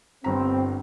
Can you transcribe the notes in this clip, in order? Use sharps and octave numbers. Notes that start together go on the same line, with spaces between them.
G1 G2 C4 A#5